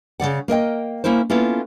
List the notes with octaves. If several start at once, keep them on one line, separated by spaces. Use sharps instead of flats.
C#3 E3 D5 F#5
A#3 A#4 D#5 G5
A#3 C#4 E4 A#4 C5
A#3 B3 C#4 E4 F4 A4